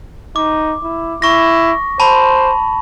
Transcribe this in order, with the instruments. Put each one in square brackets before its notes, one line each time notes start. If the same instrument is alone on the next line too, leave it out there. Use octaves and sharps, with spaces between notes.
[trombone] D#4 [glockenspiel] D6
[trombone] E4
[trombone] E4 [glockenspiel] C#6 A#6
[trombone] C5 [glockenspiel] A5 B5